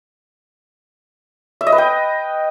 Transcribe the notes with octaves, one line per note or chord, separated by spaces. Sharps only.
E5
D#5
B4
G5